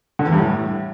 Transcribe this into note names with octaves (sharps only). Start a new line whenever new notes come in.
D3
E2
G2
A2